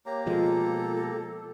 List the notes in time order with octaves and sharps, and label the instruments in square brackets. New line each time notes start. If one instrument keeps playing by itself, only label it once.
[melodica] A#3 G4 A#5 [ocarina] C#5
[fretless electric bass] B2 F3 G#3 [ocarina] F4 [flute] A4